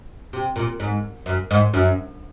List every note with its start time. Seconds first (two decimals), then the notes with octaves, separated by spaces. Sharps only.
0.33 C3
0.56 A#2
0.80 G#2
1.26 F#2
1.51 G#2
1.74 F#2